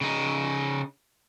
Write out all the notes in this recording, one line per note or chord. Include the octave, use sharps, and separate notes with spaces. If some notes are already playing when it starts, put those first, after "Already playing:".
C#3 D#4